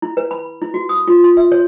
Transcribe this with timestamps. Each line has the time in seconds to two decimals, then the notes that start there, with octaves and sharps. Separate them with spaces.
0.02 E4
0.17 B4
0.31 B5
0.62 E4
0.74 F#4
0.89 D#6
1.08 F4
1.24 C6
1.37 E5
1.52 C#5